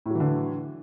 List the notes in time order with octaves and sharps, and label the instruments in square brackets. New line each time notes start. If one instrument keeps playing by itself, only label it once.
[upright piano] A2
F#3
E3
D3